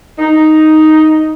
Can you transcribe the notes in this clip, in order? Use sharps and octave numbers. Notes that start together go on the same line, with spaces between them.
D#4